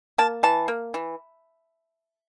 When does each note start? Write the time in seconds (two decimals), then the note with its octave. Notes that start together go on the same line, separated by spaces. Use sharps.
0.18 A#3 A5
0.43 E3 A5
0.68 A#3
0.94 E3